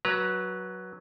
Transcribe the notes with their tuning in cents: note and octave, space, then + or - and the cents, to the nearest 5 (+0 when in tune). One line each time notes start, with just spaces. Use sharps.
F#3 +0 B4 -20 A#5 +5